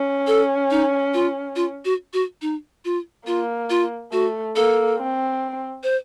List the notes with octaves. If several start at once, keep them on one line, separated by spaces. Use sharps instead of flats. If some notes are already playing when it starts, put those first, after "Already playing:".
Already playing: C#4
A4
D#4
F4
F4
F#4
F#4
D#4
F4
A#3 F4
F4
A3 F#4
A#3 A4
C4
C5